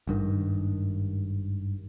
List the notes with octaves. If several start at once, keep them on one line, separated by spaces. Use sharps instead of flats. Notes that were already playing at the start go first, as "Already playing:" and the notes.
G#1 G2 D#3